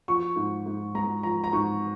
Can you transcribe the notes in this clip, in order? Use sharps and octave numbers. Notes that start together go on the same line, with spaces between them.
F3 C#6
G#2
G#2
G#3 A#5
F3 A#5
A#5
G#2 C#6